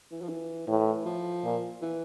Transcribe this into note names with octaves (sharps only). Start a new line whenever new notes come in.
E3
F3
E3
A2 E3
F3
A#2
E3